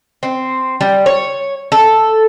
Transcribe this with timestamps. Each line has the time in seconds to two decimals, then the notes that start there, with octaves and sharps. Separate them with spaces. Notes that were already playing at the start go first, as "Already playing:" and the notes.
0.23 C4
0.81 G3
1.06 C#5
1.72 A4